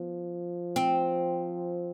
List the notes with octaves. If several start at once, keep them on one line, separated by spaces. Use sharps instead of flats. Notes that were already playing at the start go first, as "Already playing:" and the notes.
Already playing: F3 B3
C4